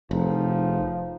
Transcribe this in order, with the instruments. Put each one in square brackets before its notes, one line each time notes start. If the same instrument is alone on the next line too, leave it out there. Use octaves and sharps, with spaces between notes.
[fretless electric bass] F1 [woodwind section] E2 A2 D#4 [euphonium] F3